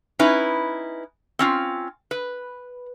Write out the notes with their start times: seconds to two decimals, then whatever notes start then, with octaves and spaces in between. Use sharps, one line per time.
0.19 C#4 D#4 E4 B4
1.39 C4 C#4 F4
2.11 B4